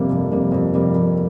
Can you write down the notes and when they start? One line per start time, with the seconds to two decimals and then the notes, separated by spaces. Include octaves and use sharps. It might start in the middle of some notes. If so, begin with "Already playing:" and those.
Already playing: F2 C3 G3 A#3
0.10 F2
0.31 C3 G3 A#3
0.52 F2
0.74 C3 G3 A#3
0.95 F2